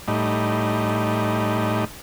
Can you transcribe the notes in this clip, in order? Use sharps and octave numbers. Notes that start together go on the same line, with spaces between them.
A2 G3 D#4